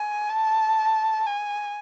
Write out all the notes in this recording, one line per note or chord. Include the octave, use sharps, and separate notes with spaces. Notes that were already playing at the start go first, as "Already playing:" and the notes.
Already playing: G#5
A5
G#5